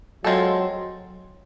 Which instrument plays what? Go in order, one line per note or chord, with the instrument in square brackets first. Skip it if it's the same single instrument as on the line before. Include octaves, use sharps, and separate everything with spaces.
[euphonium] F#3 [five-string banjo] G#3 C4 F4 A4